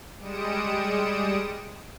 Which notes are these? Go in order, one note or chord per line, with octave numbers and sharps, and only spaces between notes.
G3 G#3 D#6 C#7 D7 E7